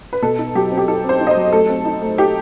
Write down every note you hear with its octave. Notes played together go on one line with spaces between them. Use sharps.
B4
B2 A4
D#4
F#3 G4
C4
G4
D#4 A4
C4
C5
D#4
D#5
C5
F#3
A3 A4
C4
D#4
A3
D#4 G4